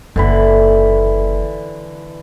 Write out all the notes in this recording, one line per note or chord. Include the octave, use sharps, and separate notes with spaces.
F#1 D3 E3 A#3 B5